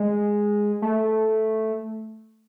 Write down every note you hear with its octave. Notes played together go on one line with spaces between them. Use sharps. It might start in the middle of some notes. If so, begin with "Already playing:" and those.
Already playing: G#3
A3